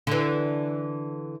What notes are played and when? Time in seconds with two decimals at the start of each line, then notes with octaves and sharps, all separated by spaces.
0.07 D3 E3